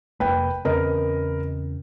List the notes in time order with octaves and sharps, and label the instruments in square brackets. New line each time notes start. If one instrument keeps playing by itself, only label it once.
[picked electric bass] F1 D#2 A#3 [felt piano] B4 G5
[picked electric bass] E2 C#3 C4 [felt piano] A#4 B4 D#5